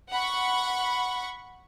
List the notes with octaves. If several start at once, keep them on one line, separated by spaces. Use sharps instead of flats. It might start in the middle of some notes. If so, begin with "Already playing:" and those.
F#5 B5 C#6